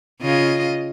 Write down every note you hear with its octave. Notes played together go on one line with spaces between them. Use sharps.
C#3 F4 D#5